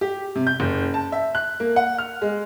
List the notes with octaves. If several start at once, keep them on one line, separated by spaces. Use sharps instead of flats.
G4
C3
G6
F#1
A5
E5
F#6
A#3
F#5
F6
G#3